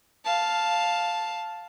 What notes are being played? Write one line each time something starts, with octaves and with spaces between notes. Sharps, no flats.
F5 A5